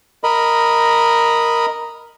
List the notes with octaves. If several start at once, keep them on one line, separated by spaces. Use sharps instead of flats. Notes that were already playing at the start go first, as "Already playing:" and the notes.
A#4 D#5 B5